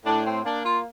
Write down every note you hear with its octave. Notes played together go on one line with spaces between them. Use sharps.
A2 D4
C4
A#3 D4
F4